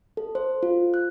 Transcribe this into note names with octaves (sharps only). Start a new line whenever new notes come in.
A4
C5
F4
F#6